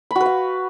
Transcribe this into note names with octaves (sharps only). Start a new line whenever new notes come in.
F#4 B4 F5 B5